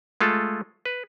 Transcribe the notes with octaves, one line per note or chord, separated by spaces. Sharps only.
G#3 A3 F4 A4
B4